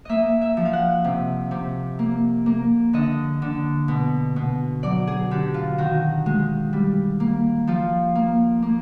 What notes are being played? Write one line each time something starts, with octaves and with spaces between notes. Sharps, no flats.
A#3 D#5 E5
E5
F3
F5
F#5
C3
C3
A#3
A#3
D3 D#5
D3
B2
B2
F#3 D5
G#4
D3 G4
F4
D#3 F#4
G#3
G3
A#3
F3 F4
A#3
A#3